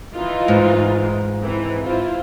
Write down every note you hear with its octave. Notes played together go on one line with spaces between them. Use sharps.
E3 D#4 F4
G#2
E3 C4
E4 F4 C5